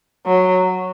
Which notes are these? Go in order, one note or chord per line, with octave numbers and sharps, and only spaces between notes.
F#3